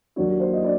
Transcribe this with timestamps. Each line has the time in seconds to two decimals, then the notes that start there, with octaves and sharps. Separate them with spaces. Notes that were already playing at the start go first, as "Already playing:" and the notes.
0.16 D#2 D#3 F#3 A#3 D4 C#5
0.40 C5
0.53 D#5
0.63 D4 D5